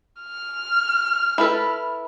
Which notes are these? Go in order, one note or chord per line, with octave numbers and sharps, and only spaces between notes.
F6
E4 A4 B4